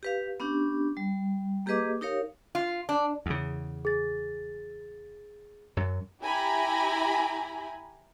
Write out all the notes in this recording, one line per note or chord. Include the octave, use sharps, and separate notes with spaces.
G4 B4 F5
B3 C#4 D4 G4
G3
A#3 G4 G#4 B4 D#5 D6
D#4 G4 A#4 C#5 F5
F4
D4
E2 C#3
G#4 A6
F#2 F#3
E4 G4 G#5 A#5 B5